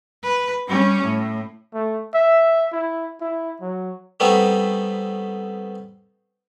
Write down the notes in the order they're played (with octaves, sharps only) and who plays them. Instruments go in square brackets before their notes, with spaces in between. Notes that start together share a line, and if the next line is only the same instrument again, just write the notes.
[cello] B4
G3 C#4
A2
[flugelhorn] A3
E5
E4
E4
F#3
[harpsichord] G3 A3 B3 C4 D#4